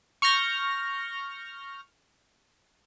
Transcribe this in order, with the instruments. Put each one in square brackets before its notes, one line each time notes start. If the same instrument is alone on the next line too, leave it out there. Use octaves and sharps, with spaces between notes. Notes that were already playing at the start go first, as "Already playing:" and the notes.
[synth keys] C#6 F6 G6 A#6